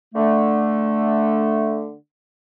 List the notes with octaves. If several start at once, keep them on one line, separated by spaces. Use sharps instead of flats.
D3 A3